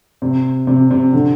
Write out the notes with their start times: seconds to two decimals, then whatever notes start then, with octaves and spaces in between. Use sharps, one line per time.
0.22 C3
0.67 C3
0.91 C3
1.13 D3